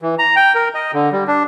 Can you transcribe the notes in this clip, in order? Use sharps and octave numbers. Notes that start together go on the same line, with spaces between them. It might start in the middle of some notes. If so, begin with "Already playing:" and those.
E3
A#5
G5
A#4
D#5
D3
G3
D4